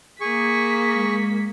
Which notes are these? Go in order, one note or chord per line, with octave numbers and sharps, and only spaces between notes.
A#3 G#4 C#6 B6
G#3